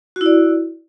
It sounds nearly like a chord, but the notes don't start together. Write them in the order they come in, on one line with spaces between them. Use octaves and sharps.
F#4 E4 D5